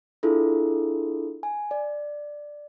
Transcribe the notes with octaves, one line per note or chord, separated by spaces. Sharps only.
D4 E4 F4 G#4 A4
G#5
D5